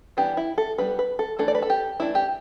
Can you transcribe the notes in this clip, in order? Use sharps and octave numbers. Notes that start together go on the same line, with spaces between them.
E3 G3 B3 D4 G4
E4
A4
G3 B3 D4 B4
B4
A4
E3 A3 D4 A4
D5
B4
A4
G4
E3 A3 D4 E4
G4